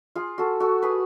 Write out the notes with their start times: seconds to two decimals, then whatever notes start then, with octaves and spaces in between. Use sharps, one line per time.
0.15 F4 G#4
0.38 F#4 A4
0.60 F#4 A4
0.82 G#4 B4